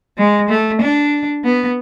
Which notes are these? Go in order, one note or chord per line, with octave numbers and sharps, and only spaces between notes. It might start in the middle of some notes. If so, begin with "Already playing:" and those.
G#3
A3
D4
B3